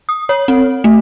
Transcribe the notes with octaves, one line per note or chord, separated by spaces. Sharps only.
D#6
C#5
C4
A3